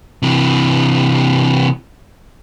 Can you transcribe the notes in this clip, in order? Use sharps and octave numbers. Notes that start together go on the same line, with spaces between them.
C3 E3